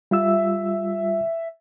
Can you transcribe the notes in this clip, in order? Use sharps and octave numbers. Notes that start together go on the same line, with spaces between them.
G3 F4 E5 E6